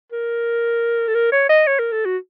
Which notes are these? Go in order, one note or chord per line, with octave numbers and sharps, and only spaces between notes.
A#4
A4
A#4
C#5
D#5
C#5
A#4
A4
F#4